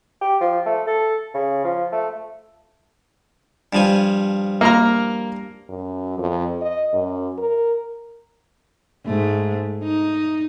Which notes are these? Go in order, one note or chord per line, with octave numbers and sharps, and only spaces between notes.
G4
F3
A3
A4
C#3
F3
A3
G2 F3 G#5
A#3 A#4 A#5
F#2
F2
D#5
F#2
A#4
G#2 A3
D#4